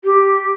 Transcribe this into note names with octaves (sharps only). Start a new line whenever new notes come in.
G4